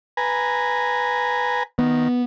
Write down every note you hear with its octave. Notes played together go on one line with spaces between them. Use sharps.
B4 G#5 A#5
D#3 B3